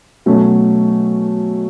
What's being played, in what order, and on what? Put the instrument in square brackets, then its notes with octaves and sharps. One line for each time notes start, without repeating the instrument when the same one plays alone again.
[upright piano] B2 F#3 A3 C#4